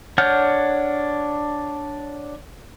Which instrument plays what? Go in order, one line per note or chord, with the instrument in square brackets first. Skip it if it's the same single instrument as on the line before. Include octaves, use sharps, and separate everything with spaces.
[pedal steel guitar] D4 C#5 F#5 F6 G6